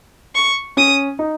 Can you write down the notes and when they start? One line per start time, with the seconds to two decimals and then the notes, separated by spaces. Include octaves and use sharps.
0.35 C#6
0.77 C#4 D#6
1.19 D#4